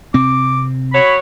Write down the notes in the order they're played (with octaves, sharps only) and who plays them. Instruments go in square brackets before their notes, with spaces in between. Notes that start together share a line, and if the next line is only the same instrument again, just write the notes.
[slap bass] C3 C4 [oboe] D6
[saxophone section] F#3 C#5 [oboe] B5